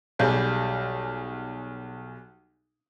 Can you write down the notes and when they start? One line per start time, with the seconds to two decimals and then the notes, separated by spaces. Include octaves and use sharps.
0.19 B1 G3 G#4 G6